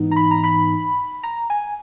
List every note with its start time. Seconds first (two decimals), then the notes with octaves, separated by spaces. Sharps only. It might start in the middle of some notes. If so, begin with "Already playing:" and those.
Already playing: G#2 E3 B3 D#4
0.11 A#5
0.16 B5
0.31 A#5
0.44 B5
1.23 A#5
1.50 G#5